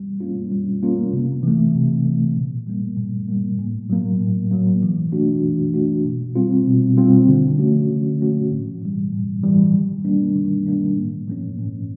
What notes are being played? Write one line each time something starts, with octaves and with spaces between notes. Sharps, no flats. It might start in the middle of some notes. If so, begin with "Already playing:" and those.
Already playing: G3
A#3 C#4 F4
G3
A#3 C#4 F4
C3
E3 A3
C3
E3 A3
A#2
G3 A#3
A#2
G3 A#3
A2
F#3 A#3
A2
F#3 A#3
E3
A3 D4 F#4
E3
A3 D4 F#4
B2
G3 C4 F4
B2
G3 C4 F4
D3
F3 A3 C#4 F#4
D3
F3 A3 C#4 F#4
A2
E3 G3
A2
E3 G3
D#3
G3 A#3 D4
D#3
G3 A#3 D4
A2
F3 A#3 C#4
A2